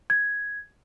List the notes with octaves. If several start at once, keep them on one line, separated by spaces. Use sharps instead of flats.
G#6